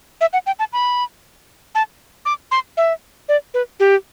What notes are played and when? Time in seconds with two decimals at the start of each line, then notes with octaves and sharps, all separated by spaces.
0.21 E5
0.33 F#5
0.47 G5
0.59 A5
0.73 B5
1.75 A5
2.25 D6
2.51 C6
2.77 E5
3.29 D5
3.54 B4
3.80 G4